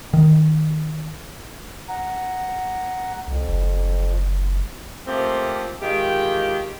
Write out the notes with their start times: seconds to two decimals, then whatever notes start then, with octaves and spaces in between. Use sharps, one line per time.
0.13 D#3
1.89 F#5 A#5
3.27 C2 F2
3.48 F#1
5.07 F3 A3 A#3 C4 G4
5.81 D#3 G#3 F4 G4